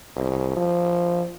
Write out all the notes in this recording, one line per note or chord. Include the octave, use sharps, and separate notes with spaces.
C2
F3